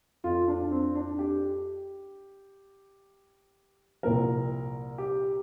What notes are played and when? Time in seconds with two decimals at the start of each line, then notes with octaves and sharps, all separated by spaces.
0.24 F2 F3 F4
0.48 D4
0.71 C4
0.95 D4
1.19 G4
4.03 C2 A#2 F3 A#4
4.98 G4